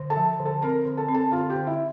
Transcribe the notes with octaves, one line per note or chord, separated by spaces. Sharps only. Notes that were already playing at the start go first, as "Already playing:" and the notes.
Already playing: D3
A4 A5
F3
D3
A4 A5
C4 A#4 A#5
D3
A4 A5
C4
A4 A5
D3 F4 F5
G4 G5
D3
E4 E5